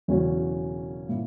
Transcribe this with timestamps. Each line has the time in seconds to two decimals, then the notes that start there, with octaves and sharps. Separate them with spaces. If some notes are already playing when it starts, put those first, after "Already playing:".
0.08 E1 E2 C#3 F#3 C#4
1.08 A#2 A#3 E4